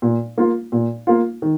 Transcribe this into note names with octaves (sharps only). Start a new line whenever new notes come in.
A#2
A#3 F4
A#2
A#3 F4
D#3